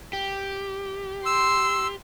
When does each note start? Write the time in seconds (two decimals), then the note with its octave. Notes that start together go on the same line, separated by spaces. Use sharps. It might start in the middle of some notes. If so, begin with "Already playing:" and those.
0.13 G4
1.26 C6 E6